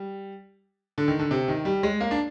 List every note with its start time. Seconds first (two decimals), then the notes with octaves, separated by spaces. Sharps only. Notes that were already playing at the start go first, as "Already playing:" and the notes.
Already playing: G3
0.98 D3
1.08 D#3
1.19 D3
1.31 C3
1.48 D#3
1.65 G3
1.83 G#3
2.00 A#3
2.11 D4